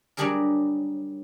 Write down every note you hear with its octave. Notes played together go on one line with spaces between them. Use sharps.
F#3 G3 D4 G4 G#4 A#4